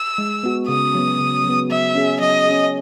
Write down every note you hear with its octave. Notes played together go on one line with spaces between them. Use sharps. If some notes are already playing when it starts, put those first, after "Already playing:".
Already playing: E6
G#3
B3 F#4
C#3 D#6
F#3 B3
C#3
F#3
B3
F#3 E5
C#4 G#4
F#3 D#5
C#4 G#4